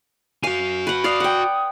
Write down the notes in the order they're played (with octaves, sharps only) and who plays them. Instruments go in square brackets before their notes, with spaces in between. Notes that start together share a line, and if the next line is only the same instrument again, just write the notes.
[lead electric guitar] F#4 G#5 [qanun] F5
[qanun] B4 F#5 [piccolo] C#6
[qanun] D5 F5 [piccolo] D#6
[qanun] F#5 G5